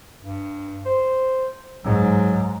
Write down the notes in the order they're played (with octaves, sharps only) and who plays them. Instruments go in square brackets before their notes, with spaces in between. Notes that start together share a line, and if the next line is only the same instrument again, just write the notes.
[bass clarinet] G2
C5
[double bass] G#2 [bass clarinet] F#3